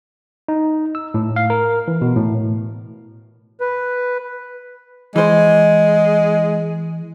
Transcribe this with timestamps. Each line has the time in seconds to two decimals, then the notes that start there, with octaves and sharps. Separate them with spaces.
0.48 D#4
0.95 E6
1.14 A2
1.36 F5
1.50 A#4
1.88 E3
2.01 B2
2.16 A2
3.61 B4
5.16 E3 G#3 C5